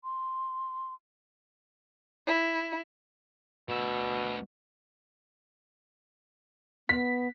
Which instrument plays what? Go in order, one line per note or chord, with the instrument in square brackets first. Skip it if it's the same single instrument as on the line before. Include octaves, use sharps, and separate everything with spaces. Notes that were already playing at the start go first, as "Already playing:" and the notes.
[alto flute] C6
[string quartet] E4
[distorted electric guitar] D2 E5 [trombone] B2
[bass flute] B3 [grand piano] B6